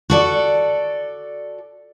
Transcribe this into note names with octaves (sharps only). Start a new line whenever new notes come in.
F#4 A4 D5